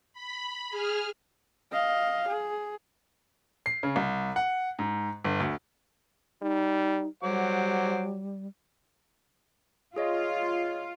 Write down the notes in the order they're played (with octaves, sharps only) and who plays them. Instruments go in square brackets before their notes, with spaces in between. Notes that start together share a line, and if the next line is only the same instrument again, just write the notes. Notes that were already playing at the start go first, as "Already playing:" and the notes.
[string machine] B5
G#4 F6
[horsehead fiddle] D#5 F5
G#4
[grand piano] C7
C#3
C2
F#5
G#2
G1
D2
[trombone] G3 [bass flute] D#4
[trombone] F#3 [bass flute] G3 [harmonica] C5 F#5 D6
[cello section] F4 [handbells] G#4 C#5 D#5